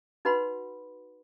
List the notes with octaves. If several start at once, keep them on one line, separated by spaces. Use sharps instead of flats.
D#4 F#4 B4 F#5 B5 C6